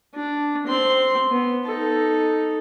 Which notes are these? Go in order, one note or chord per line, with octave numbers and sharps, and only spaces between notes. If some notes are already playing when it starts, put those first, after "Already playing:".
D4
C4 C6
B3
D#4 A4